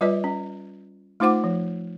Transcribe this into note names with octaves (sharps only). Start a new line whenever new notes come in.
G3 F4 B4 D5 D#5
C#4
A3 D#4 F4 C5 F#5 D6
F3